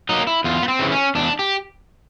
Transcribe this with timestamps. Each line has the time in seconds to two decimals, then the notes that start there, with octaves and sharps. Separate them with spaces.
0.09 F#3 A#3 D#4
0.27 E4
0.44 E2 F4
0.63 B3
0.68 C4
0.79 C#3 E3
0.92 C#4
1.15 E2 D4
1.39 G4